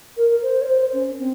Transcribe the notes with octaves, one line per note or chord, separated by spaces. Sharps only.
A#4
C5
C#5
C5
C#4
C4